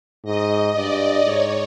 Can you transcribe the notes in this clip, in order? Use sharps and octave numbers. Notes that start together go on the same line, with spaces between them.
G#2 D#5
G2 D5
G#2 C#5